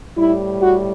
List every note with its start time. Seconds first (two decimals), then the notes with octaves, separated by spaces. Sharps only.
0.17 A2 G3 E4
0.61 F#4